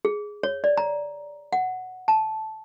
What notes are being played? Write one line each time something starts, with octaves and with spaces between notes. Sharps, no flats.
G#4
C#5
D5
A#5
F#5
A5